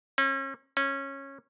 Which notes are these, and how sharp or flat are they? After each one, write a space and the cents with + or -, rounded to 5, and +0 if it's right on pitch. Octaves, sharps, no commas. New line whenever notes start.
C#4 -35
C#4 -15